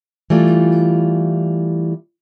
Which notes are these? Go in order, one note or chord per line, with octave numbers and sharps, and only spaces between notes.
E3 G3 A3 F4